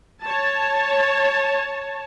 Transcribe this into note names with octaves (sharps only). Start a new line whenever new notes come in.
C#5 A5